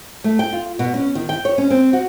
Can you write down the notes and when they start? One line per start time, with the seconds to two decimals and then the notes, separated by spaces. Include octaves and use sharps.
0.24 A3
0.39 G5
0.53 F4
0.79 B2
0.94 C#4
1.15 D#3
1.29 G5
1.45 C#5
1.58 C#4
1.70 C4
1.93 F#4